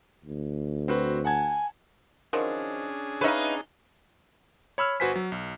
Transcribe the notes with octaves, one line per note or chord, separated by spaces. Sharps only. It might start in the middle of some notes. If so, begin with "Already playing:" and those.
D2
C4 F#4 B4
F#5 G#5 A5 G#6
D#3 F3 F#3 C#4 D4 G#4
D#4 B4 C#5 E5 F5
C#5 B5 E6 F6
G1 F#4 B4 C5 G#5 B6
F#3
B1